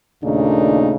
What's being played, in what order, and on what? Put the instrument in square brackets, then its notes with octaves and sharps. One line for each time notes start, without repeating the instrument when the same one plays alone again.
[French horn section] D#2 A#2 C#3 A3 D4 D#4